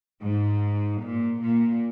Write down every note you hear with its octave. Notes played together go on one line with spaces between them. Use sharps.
G#2
A#2
A#2